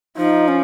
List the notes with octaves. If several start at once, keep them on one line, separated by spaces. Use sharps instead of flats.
F3 D#4
C#4